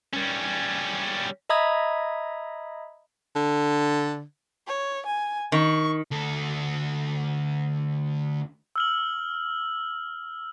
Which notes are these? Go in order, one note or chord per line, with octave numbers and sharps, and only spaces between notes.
G3 C#4
D#5 E5 A#5 B5 D#6 G#6
D3
C#5
G#5
D#3 C#6
D2 A4
E6 F6 F#7